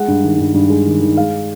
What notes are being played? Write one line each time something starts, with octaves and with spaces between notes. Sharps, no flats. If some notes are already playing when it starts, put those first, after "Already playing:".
Already playing: G#3 F#5
G2
D#3
G2
G2
G#3
D#3
D#3
G#3 F5